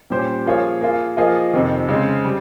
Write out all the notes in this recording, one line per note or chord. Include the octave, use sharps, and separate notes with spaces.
A#2 G3 C#4 G4 C5
F3 A#3 F4 G#4 C#5
A#3 F4 G#4
F3 A#3 F4 G#4 D#5
F2 C3 D#3
C#3 G#3 C4
G3